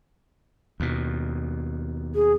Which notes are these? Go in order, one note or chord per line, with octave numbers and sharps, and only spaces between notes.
D#2 B2
G#4